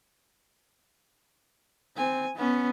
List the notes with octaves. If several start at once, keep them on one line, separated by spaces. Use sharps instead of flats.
C4 G#5
B3 C#4